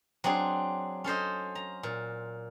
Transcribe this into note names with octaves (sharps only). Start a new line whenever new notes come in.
F#3 C4 D4 G#4
C#4 A4 C5 D#5
A#5
A#2